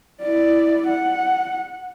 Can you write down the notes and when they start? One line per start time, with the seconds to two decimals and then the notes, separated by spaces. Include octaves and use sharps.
0.22 E4 D5
0.88 F#5